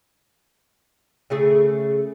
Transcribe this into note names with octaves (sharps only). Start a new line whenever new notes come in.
C#3 A3 G#4